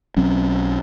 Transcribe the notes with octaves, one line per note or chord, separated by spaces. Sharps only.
B1 F#3 C4 C#4